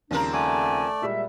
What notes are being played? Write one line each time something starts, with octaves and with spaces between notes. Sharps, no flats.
D#2 C#3 F3 G3 C4 D4 A#4
A3 D5 E5 F#5 G#5
A#2 G3 G#3 E5